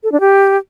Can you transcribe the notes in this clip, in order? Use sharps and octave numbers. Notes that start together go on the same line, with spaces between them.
A4
D4
G4